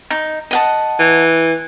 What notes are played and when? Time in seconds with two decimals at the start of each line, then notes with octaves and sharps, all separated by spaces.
0.10 D#4
0.51 D#5 F#5 A5
0.99 E3